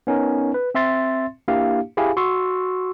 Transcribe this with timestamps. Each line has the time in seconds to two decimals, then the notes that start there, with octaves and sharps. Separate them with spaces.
0.07 B3 C#4 D#4 A#4
0.54 B4
0.75 C4 E5 C6 A6
1.48 A#3 D4 E4 G4 F5
1.97 E4 G4 G#4 F5 G#5 B5
2.17 F#4 C6 C#6 E6